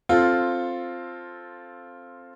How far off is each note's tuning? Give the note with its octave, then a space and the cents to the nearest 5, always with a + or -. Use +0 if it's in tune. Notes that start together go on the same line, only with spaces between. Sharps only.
C4 +10 F4 +0 A4 +0